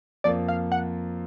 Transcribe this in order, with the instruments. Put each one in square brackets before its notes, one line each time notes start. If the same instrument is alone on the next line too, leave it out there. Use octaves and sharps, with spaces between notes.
[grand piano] F2 F3 A#3 F4 A#4 [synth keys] D5
[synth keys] F5
F#5